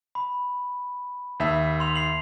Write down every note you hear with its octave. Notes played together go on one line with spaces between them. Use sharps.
B5
D#2 E5
C6 F7
C7 F#7